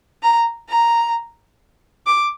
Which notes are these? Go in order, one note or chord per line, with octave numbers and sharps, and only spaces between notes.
A#5
A#5
D6